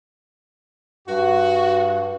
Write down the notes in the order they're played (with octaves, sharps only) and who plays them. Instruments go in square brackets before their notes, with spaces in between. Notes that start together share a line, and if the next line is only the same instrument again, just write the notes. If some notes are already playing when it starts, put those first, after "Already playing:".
[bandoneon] G2 [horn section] F#4